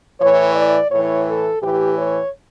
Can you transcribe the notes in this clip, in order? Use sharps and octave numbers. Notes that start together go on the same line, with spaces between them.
A2 E3 C#5
D5
A2 E3 C#5
A4
A2 E3 G4
C#5